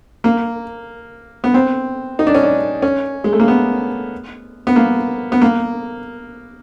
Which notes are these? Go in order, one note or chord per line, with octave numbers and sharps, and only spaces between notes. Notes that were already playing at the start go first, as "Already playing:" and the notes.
A#3
B3
C4
D#4
D4
C#4
D4
C#4
G#3
A3
A#3
B3
B3
A#3
B3
A#3